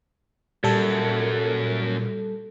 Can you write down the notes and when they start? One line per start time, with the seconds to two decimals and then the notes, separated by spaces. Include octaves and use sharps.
0.64 F#2 A#2 G3 A4